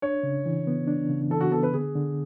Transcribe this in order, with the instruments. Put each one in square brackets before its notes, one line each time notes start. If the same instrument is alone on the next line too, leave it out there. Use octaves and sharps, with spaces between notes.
[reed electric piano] D4 [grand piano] C#5
[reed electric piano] C#3
E3
B3
D4
C#3
[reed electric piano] E3 [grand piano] A4
[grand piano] F#4
[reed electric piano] B3 [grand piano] A4
[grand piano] B4
[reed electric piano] D3 [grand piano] G#4
[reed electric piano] D3